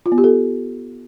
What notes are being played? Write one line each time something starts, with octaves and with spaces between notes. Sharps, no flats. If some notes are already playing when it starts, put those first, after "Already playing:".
F4
B3
G4
A4